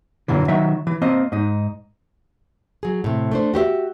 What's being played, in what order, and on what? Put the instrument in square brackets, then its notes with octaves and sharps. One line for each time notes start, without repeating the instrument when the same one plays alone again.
[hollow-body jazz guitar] F#2 A#2 D3 E3
D#3 F#3 E5
E3
A#3 C4 C5 D#5
G#2 D#4
[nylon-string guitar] F#3 G#4
A2 C3
A3 D4 C5
F#4 G4 C5 E5